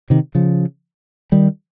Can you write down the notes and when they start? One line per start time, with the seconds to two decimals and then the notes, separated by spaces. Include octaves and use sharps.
0.10 C3 D#3
0.35 C#3 F3
1.32 D#3 G3